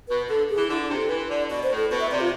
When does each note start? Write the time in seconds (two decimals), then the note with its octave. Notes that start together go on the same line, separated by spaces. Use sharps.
0.08 B2 B4
0.29 D3 A4
0.50 G#4
0.56 E3
0.69 D3 E4
0.83 D4
0.90 C3
0.96 A4
1.09 E3 B4
1.29 D3 D5
1.50 B2 D5
1.63 C5
1.71 A2
1.77 A4
1.91 B2 B4
2.00 E5
2.11 C3 D5
2.20 F4